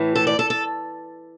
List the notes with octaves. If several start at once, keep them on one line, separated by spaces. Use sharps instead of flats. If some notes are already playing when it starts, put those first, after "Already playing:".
Already playing: A2 E3
A4
D5
A4
A4